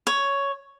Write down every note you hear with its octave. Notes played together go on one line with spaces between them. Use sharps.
C#5